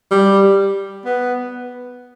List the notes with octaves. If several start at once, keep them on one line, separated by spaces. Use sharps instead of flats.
G3
B3